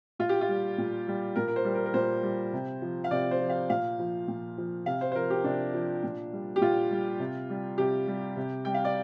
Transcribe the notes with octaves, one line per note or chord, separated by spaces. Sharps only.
A#2 F4
G4
F4
G3
A#2
G3
A#2 A#4
A#4
C5
G3
A#4
A#4
A#2 C5
G3
C3
F3
F5
C3 D5
C5
F3
F5
A#2 F5
F3
A#2
F3
C3 F5
C5
C5
F3 A#4
G4
C3 D4
F3
A#2
G3
G4
A#2 F4
G3
C3
G3
C3 G4
G3
C3
G3 G5
F5
D5